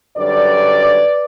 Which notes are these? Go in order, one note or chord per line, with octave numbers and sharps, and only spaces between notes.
F#2 D3 G3 B4 D5